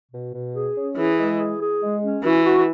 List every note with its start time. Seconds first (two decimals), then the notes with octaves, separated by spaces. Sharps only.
0.12 B2
0.33 B2
0.54 G#4
0.75 C#4
0.96 E3 G#4
1.18 G#3
1.38 G#4
1.60 G#4
1.81 G#3
2.02 C#4
2.23 E3 F#4
2.45 F#4